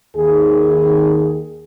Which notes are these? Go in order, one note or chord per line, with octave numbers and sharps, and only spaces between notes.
D#2 D#3 G#4